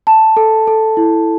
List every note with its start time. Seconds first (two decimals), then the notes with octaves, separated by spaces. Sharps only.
0.07 A5
0.37 A4
0.67 A4
0.97 E4